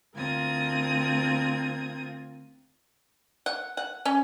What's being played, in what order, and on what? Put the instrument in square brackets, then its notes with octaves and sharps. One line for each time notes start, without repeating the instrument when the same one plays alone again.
[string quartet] D2 C4 F4 A#4 D#6 G#6
[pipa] F#5
F#5
C#4